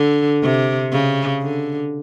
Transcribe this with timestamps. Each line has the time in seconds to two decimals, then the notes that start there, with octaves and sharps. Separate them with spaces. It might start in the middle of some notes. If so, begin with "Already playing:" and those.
Already playing: D3
0.43 C3
0.92 C#3
1.42 D3